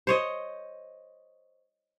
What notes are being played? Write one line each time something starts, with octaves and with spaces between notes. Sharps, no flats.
C5 C#5 D#5